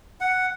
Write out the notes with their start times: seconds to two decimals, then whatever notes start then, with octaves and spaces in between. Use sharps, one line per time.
0.21 F#5